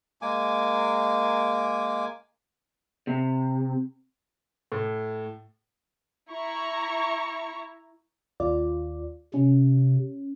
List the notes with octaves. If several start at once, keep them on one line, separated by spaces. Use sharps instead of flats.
G#3 A#3 G#5 D6
C3
A2
E4 A#5 C#6
D#2 F4 D5
C3 C#4